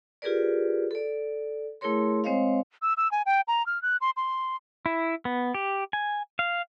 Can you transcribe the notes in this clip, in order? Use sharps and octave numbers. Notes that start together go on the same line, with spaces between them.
F4 G4 G#4 A#4 B4 D5
A4 D5
A3 E4 G#4 A#4 C#5 C6
G#3 C4 C5 C#5 D#5 F5
E6
E6
G#5
G5
A#5
F6
F#6
C6
C6
E4
B3
G4
G#5
F5